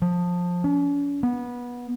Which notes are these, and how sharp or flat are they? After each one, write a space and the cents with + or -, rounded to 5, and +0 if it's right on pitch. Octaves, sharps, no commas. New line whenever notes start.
F3 +20
C#4 +45
B3 -20